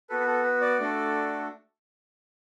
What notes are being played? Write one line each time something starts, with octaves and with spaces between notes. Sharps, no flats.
B3 F#4 A4 B4
B4
A4
B4
D5
A3 D4 F#4 A4